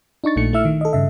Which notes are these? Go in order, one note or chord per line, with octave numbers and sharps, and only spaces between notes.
D4 D#4 C#6 A6
A#1 A#2 A3 C#7
A3 E4 E5 E6 F6
D#3
A4 D#5
G2 C#3 E5